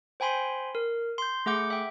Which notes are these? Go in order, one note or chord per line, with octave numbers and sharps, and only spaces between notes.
C5 G5 G#5 B5 C6
A#4
C6 G6
A3 G#4 F#5 D6 G6
E5 G5